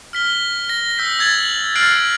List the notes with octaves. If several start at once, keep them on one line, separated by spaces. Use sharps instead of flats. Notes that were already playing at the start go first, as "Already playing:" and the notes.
F6 B6 G7
A#6
E6 G6 B6
E6 G#6 A6 F#7
F6 F#6 A6 C7 D7 F#7